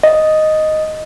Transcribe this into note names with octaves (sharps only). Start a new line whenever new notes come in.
D#5